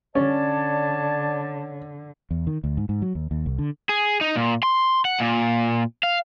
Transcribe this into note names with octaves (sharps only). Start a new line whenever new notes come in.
D3 C#4 C#5 D5 A5
E2
D#3
D2
G#2
G#2
F#3
D#2
D#2
C2
D3
G#4
D#4
A#2
C6
F#5
A#2
F5